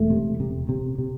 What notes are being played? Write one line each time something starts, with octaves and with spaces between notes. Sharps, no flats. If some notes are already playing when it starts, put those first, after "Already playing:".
Already playing: E1 A3
C3
C3
C3
C3